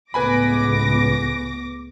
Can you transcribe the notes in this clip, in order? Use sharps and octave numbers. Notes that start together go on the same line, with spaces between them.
C#2 A2 B3 B4 G#5 B5 D6 A#6